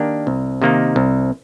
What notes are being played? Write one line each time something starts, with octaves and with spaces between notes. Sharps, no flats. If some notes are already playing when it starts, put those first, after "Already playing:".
Already playing: D#3 A#3 D4 G4
C2
C3 D#3 A#3 D#4
C2